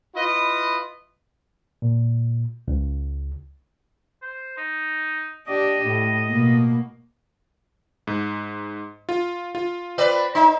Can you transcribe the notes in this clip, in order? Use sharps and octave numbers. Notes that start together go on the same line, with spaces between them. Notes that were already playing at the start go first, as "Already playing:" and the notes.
E4 F4 B4 D#5
A#2
C#2
C5
D#4
D4 G4 D#5
A2
B2 A#3
G#2
F4
F4
C4 B4 D5
D#4 E5 C6